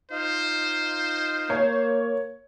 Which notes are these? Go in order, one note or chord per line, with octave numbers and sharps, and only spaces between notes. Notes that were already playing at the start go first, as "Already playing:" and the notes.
D#4 F4 C5
A#3 C#5